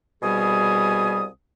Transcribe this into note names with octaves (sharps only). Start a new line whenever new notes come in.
C2 B2 G3 G#4 G#5 D#6